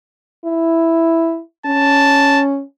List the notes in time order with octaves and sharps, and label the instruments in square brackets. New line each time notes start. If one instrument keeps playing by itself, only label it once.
[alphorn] E4
[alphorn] C#4 [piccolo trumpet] A5